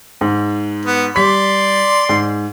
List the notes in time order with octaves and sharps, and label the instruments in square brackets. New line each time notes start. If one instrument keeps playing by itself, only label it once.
[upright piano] G#2
[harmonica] B3
[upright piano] G3 B6 [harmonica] D5 C6
[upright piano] G#2